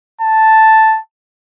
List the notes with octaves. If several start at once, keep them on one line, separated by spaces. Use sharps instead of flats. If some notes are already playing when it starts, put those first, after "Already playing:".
A5